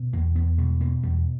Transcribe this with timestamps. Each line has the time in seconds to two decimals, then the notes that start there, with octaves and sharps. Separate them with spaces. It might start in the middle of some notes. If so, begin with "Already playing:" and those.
Already playing: B2
0.13 E2 A#3
0.36 E2 B3
0.58 B2 G3
0.80 B2 A#3
1.03 E2 G3